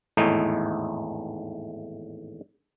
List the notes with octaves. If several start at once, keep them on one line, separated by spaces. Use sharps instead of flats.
G#1 E2 A2 A3 D#4